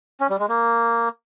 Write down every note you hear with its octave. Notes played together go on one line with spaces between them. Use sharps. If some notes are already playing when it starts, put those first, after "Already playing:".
C#4
G3
G#3
A#3